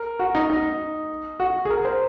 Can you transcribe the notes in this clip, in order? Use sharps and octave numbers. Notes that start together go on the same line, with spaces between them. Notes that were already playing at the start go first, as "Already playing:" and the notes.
Already playing: A#4
F#4
D#4
D#4
F#4
G#4
A#4
C5